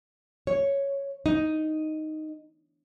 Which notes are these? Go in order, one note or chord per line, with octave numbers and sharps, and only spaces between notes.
C#5
D#4